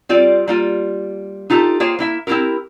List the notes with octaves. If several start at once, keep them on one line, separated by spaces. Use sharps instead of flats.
G3 C4 F4 D5
G3 A#3 F4
D#4 F4 G4 A4
A#3 F4 G#4 C5 C#5 G5
A#3 E4 E5
C4 E4 F4 G4 A#4